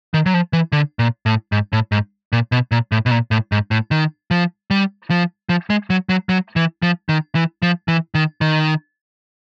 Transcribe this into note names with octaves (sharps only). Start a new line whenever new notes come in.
D#3
F#3
F3
E3
D3
A#2
A2
G#2
A2
G#2
A#2
B2
A#2
A2
B2
A#2
A2
G#2
A2
D#3
F3
G3
F3
F3
G#3
F#3
F#3
F#3
E3
F3
D#3
E3
F3
E3
D#3
D#3